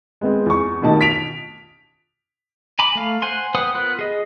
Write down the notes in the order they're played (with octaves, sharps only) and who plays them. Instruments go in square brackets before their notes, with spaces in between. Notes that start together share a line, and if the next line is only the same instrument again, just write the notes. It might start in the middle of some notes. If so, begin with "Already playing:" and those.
[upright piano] G#3 B3 C4
E2 C#6
A1 B2 D#3 A5
B6 D7 F7
[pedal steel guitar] G#5 A#5 B5 D6
A3 F5
C5 F#5 G#5 C6
B4 C5 F#5 G5 D#6
B3 F4 A#4 F#6
G#4 D#5